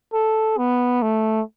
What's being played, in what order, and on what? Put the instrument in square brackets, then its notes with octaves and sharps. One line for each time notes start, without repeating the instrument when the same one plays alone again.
[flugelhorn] A4
B3
A3